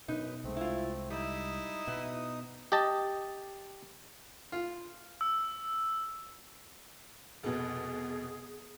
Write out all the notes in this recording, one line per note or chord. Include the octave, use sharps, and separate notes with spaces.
F#2 B2 D#4 B4
C2 G#3 A3 C4
E4 F4
G3 D#4 E4 D#6
B2 B3
G4 D#5 A5
F4
E6
F1 B2 G#4